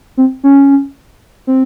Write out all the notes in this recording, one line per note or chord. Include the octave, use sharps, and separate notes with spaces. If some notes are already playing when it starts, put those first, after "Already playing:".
C4
C#4
C4